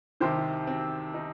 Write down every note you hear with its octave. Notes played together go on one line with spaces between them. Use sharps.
C2 C3 D#3 G4 C5
C4
D#4